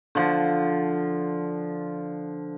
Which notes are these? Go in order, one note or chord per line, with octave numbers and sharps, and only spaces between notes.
D3 F3